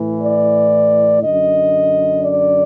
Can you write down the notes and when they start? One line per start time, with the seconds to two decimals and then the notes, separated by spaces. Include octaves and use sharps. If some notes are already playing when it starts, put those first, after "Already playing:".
Already playing: A2 E3
0.23 D5
1.21 F#2 D3 D#5
2.20 D5